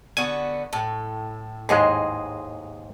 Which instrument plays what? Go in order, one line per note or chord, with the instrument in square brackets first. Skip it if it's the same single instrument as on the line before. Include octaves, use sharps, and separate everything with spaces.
[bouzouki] D3 B3 F#4 [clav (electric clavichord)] G#5
[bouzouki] A2 [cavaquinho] A4
[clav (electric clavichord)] D#2 G#2 G#3 [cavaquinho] G#4 D#5 C6